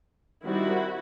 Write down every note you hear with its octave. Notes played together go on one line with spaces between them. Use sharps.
D#3 G3 C4 E4 F#4